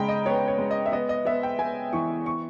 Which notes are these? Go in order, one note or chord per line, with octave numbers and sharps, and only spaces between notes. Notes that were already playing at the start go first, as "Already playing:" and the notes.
Already playing: C#3 G#3 G5 A#5 B5
D#5
B3 C#5
C#5
G#3
D#5
E5
B3 D#5
D#5
B3 E5
G5
B3 G#5
E3 C#6
C#6